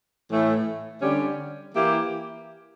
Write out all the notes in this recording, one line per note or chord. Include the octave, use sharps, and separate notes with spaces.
A2 E3 A3
D3 G3 C#4 G4
E3 A#3 E4 G4